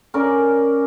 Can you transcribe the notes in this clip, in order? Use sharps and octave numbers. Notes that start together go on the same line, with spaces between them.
C#4 A#4 D5